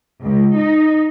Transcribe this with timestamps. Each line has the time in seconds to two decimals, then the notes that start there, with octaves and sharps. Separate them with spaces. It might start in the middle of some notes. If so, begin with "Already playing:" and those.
0.23 C#2
0.56 D#4